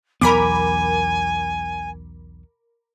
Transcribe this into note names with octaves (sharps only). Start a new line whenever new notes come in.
B1 E2 B3 A#4 G#5 B5 D6